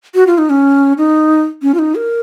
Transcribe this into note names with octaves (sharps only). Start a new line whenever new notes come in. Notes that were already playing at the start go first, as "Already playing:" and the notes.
F#4
F4
D#4
C#4
D#4
C#4
F4
D#4
A#4